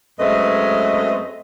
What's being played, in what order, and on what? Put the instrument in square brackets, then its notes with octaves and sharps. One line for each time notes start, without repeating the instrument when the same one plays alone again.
[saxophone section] F#2 G#3 A3 C4 B4 D#5